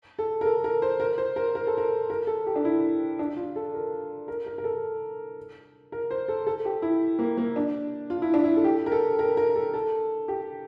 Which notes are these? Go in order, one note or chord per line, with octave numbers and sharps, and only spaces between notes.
A4
A#4
A4
A#4
C5
A#4
C5
A#4
A#4
A4
A#4
A#4
A4
G4
D4
E4
D4
F4
A4
A#4
A#4
A#4
A#4
A4
A#4
C5
A4
A4
G4
E4
A#3
A#3
D4
F4
E4
D4
E4
A4
G4
A#4
A4
A#4
A#4
A4
A4
G4